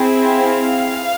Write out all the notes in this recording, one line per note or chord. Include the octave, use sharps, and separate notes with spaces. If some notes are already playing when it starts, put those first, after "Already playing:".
Already playing: C4 E4 G#4
F5